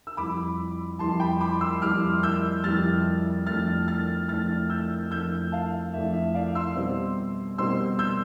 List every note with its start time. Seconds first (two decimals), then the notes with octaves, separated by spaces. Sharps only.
0.07 E6
0.17 F2 E3 G3 B5 D6
0.99 F2 E3 G3 A5 C6
1.20 G5 B5
1.40 B5 D6
1.61 C6 E6
1.82 F2 E3 G3 D6 F6
2.23 E6 G6
2.64 F2 E3 G3 F6 A6
3.46 F2 E3 A3 D4 F6 A6
3.88 F6 A6
4.28 F2 E3 A3 D4 F6 A6
4.70 E6 G6
5.11 F2 E3 A3 D4 E6 G6
5.52 F5 A5
5.93 F2 E3 A3 D4 E5
6.14 E5
6.34 D5 F5
6.55 C6 E6
6.76 B2 G3 C4
7.58 B2 G3 C4 C6 E6
7.99 E6 G6